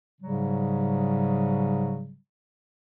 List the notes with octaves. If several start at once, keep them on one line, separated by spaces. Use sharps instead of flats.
G#2 C#3 F#3 G3